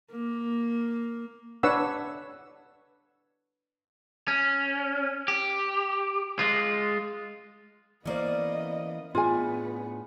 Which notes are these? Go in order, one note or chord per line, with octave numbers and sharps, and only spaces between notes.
A#3
D4 B4 C#5 F#5 E6
C#4
G4
G#3 F4
E3 A#3 B3 C#4 C5 D5 D#5
A2 B3 D4 F4 G#4 G#5